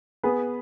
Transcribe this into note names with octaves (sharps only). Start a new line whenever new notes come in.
B3 G#4 B4